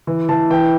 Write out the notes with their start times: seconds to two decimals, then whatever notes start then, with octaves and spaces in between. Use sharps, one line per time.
0.07 E3
0.29 E3 A5
0.50 E3 G5